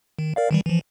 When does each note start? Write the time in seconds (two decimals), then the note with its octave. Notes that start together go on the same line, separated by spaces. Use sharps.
0.19 D#3
0.36 A#4 D5 F5
0.51 D#3 E3 G3
0.66 E3 F3